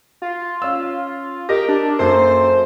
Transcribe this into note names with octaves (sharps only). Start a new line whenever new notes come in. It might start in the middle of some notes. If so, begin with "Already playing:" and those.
F4
C#4 E6
G4 A#4 D#5 A#6
D4
F#2 A#3 A4 C5